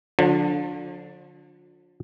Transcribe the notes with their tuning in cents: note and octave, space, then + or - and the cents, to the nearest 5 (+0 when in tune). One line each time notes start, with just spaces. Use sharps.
D3 -5 F3 +40